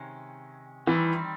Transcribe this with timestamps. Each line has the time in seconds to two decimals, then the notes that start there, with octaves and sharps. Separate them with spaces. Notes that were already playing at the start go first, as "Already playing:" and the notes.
Already playing: C3 D#3 G#3 C#4
0.87 D#3 E3 G3 C4